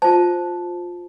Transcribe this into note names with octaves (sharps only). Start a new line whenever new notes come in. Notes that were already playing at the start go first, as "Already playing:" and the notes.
F4 C5 A5